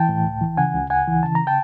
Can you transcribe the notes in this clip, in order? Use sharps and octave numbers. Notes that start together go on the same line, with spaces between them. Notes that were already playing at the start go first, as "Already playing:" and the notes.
Already playing: E3 G5 A5
A2
C#2
E3
C#3 F#5 G#5
C#2
C#2 F#5 G#5
E3
C#3 A5
A#5
G5 A5